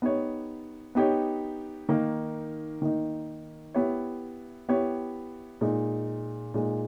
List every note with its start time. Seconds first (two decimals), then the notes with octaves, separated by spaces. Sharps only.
0.02 B3 D#4 G4 C#5
0.95 B3 D#4 G4 C#5
1.89 D#3 A#3 D#4
2.82 D#3 A#3 D#4
3.74 B3 E4 G4 C#5
4.69 B3 E4 G4 C#5
5.61 A#2 G#3 D#4
6.54 A#2 G#3 D#4